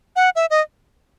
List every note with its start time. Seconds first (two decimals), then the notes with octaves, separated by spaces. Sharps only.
0.16 F#5
0.36 E5
0.50 D#5